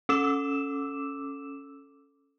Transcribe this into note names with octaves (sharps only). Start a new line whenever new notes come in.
C#4 A4 D6 E6 E7